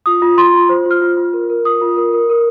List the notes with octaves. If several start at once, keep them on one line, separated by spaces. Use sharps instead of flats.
F4 D#6
F4
F4 C6
F4
C5
F4 F6
F4
F4
A#4
A#4
F4 D#6
F4
A#4
A#4
A#4